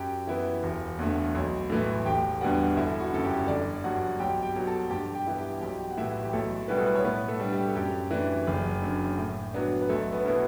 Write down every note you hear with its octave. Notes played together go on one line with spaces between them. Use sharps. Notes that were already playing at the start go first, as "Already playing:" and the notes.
Already playing: F#2 G4 G5
E3 B3 E4
E1
E2 D3 A3
B1
A2 E3 A3
E1 G4 G5
E2 D3 G3 B3 F#4 F#5
G1 E4 E5
F#4
F#2 C#3 A4
G4
G1 D4 D5
G2 F#3 F#4 F#5
B1 G4 G5
G4 G5
B2 F#3
A4 A5
G2 G4 G5
G4 G5
E3 B3 E4
G4 G5
B1 G4 G5
F#5
A2 E3 E4 E5
G4
B1 A3 A4
B2 G3 B3 E4 B4
A4
B3 B4
C#5
A2 B3 B4
A3 A4
G3 D4
G4
A4
F#2 G4
E3 A3 D4
F#1
F#2 D3
A2
F#3 B3 D4
B4
B1 A3 A4
B3 B4
B2 F#3 B3 E4 B4